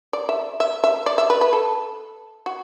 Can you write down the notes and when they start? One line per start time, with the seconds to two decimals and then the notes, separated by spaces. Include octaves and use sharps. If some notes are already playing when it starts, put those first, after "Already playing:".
0.13 D5
0.29 E5
0.60 E5
0.84 E5
1.06 D5
1.18 E5
1.30 B4
1.41 B4
1.53 A4
2.46 F#4